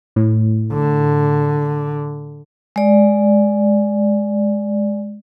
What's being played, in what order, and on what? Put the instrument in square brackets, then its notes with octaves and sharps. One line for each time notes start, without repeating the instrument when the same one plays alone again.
[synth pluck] A2
[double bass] D3
[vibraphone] G#3 D5